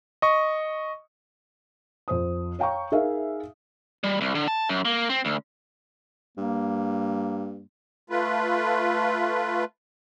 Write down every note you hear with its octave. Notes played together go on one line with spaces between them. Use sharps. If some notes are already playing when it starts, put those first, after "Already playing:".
D#5 C#6
F2 C5 D#6
C#5 F5 G5 A#5 C#6
D#4 G#4 A#4 E5 F5
G3
C2
D3
A5
F#2
A#3
C4
D2
G2 A#3
A3 F4 B4